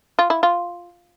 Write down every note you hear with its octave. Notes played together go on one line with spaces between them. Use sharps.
F4
E4
F4